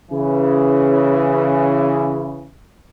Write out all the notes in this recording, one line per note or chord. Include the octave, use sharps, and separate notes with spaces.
C#3 E3